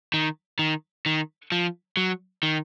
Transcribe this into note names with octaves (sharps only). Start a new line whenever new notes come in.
D#3
D#3
D#3
F3
F#3
D#3